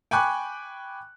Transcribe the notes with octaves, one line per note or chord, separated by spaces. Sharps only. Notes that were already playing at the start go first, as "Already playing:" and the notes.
G5 G#5 B5 C#6 D6 F#6